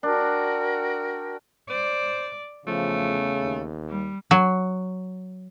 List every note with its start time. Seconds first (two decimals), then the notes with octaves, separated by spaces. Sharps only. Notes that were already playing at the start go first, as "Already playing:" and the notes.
0.03 D4 F#4 A#4 G5
1.70 C5 D5
2.67 E2 C#3 F3 A3
3.42 D#2
3.89 G3
4.31 F#3